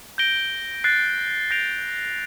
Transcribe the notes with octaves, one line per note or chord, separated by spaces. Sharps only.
G6 A#6 D7 G7
F#6 A6 C7
G6 A#6 D7 F7